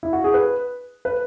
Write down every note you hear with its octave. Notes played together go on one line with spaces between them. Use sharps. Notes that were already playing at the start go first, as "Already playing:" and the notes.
E4
F#4
G#4
B4
B4